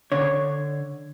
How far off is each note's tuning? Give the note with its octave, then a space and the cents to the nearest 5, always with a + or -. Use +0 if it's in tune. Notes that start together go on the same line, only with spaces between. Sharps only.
D3 +5 C#5 +0